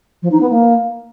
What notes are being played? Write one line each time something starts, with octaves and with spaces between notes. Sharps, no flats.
F3
D#4
B3
A#3